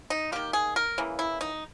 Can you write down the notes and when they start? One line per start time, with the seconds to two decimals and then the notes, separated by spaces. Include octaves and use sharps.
0.10 D#4
0.32 D#3 A#3 G4
0.53 G#4
0.76 A#4
0.98 C#3 E3 A#3
1.19 E4
1.41 D#4